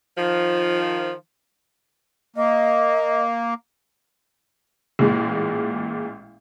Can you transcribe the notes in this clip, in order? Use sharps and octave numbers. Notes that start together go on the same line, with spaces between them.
D#3 F3
A#3 D#5
A1 A#2 G#3